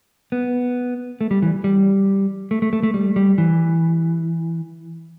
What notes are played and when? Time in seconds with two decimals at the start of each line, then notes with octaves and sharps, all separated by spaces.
0.32 B3
1.21 A3
1.31 G3
1.42 E3
1.64 G3
2.51 A3
2.62 A3
2.73 A3
2.83 A3
2.94 G3
3.16 G3
3.38 E3